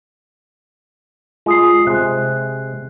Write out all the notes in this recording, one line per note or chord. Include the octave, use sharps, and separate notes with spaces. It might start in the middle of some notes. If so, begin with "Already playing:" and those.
G#3 F4 D#6 C7
C3 G#3 F#6